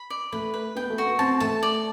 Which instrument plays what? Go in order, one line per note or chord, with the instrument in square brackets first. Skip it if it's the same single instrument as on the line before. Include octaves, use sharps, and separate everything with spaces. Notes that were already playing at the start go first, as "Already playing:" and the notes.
Already playing: [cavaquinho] B5
D5
[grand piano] A3 [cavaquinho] B4
[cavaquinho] B4
[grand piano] B3 [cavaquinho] G5
[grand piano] A3
[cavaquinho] F#4
[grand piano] B3
[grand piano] C4 [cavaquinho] A5
[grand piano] A3 [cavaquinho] A5
[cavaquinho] D5